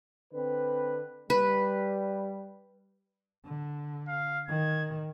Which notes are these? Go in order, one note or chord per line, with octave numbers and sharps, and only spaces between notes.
D3 C4 B4
G3 B4
D3
F5
D#3 G#6